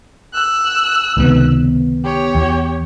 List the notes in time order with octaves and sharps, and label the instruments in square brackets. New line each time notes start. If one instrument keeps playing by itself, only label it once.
[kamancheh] E6 F#6
[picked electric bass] C#2 C3 [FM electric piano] D#3 B3
[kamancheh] G4 C#5
[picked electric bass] E2